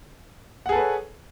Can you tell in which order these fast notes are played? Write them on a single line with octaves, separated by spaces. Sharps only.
F#5 G#4 A4 B4 C#5